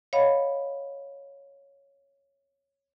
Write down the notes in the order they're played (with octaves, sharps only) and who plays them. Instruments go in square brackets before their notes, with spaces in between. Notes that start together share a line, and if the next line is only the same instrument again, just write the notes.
[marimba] C#5 D#5 F5 F#5 B5